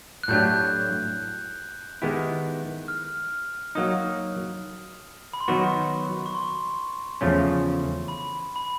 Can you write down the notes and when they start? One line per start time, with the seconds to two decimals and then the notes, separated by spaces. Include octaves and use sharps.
0.23 F#6
0.28 A2 F#3 A3 D4 G4 G6
2.02 D#3 G#3 B3 E4 G4
2.88 F6
3.75 F#3 A#3 D#4 D#6
5.33 B5
5.40 C6
5.48 D#3 F#3 B3 D#4 F#4 C#6
6.26 C#6
6.35 C6
7.21 E2 C#3 F3 A3 C#4
8.08 B5
8.56 B5